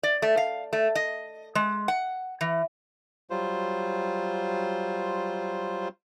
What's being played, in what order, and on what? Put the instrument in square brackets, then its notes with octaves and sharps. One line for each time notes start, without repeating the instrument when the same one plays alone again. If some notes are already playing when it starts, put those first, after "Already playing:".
[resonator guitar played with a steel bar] D5
A3
F5
A3
D#5
G#3
F#5
E3
[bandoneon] F#3 G3 F4 C5